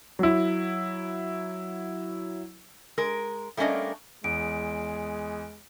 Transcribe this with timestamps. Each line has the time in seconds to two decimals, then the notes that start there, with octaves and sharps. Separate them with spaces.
0.19 F#3 E4
2.98 G#3 A#4
3.57 G3 A3 A#3 C#4 D4 D#5
4.24 E2 G#3 D7